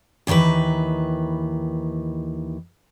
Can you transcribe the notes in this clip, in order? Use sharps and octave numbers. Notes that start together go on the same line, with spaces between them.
D#2 C3 D#3 E3 B4